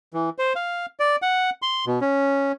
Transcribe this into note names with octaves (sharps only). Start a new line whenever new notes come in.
E3
C5
F5
D5
F#5
C6
B2
C#4